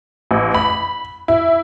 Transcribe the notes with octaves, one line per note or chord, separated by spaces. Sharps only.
A1
B5
E4